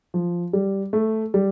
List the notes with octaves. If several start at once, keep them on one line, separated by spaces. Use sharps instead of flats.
F3
G3
A3
G3